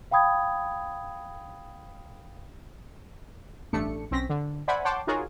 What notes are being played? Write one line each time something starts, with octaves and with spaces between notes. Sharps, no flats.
F5 G5 B5 D#6 G#6
A1 G2 A3 D4 C#7
B1 C4 C#4 A#6 B6
D3
C5 D5 E5 F#5 G#5 B5
C#5 F#5 G5 A5 C6 D6
D#4 F4 F#4 G#4 A#4 C#5